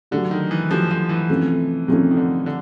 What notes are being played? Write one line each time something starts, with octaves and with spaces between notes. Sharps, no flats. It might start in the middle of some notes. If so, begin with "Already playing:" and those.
D3 F#3 A3 D4 G4
D#3
E3
F3 F#3 A3 D4 G4
F3
E3
C3 F3 A3 C#4
C3 D#3 F3 A3 C#4
D#3
D3
D3